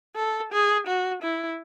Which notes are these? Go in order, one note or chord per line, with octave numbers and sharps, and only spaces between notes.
A4
G#4
F#4
E4